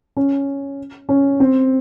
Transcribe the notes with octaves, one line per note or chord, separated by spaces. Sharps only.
C#4
C#4
C4